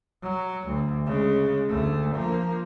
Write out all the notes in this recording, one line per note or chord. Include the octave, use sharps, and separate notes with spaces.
F#3
D2
C#3 G#3
D2 A3
F3 A#3